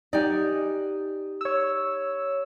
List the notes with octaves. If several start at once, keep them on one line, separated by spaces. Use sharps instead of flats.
D#4 G4 D5 F#5 G#5
C#5 E6